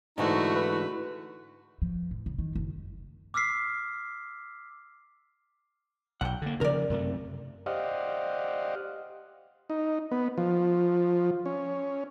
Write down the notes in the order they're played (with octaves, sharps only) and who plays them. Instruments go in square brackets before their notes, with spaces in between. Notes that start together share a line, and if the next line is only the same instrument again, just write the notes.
[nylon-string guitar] G#2 D3 E3 [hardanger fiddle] A3 F#4 [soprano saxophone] D#4 [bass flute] E4
[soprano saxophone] B4
[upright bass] F3
A2
C#3
D#3
F#1
[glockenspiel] D6 E6 F6 B6 C7
[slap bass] B1 [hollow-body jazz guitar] F#5 G5
[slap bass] D3 A#3
[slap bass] C#3 F3 [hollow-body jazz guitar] A#4 D5
[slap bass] F#2 C3 A3
[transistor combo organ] G4 C5 D5 D#5 F5 F#5
D#4
B3
F3
C#4